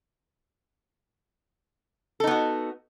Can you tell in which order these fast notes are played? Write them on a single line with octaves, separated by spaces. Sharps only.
A4 D#4 B3 F#4